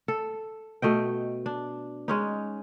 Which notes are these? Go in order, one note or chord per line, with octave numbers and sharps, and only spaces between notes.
A4
B2 A3 D#5 G5
D4
G#3 C#4 D#4